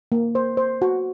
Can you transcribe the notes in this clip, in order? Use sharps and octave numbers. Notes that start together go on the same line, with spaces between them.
A#3
C5
C5
F#4